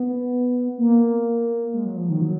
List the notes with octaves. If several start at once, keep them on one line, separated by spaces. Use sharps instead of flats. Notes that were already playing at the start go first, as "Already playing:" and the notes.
Already playing: B3
A#3
G#3
F#3
F3
D#3
F#3